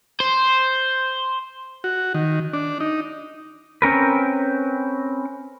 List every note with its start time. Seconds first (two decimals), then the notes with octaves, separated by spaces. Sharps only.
0.20 C5
1.84 F#4
2.15 D#3
2.53 D4
2.80 D#4
3.82 C4 C#4 A#4 B4